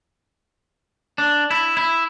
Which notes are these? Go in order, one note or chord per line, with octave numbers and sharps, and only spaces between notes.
D4
E4
E4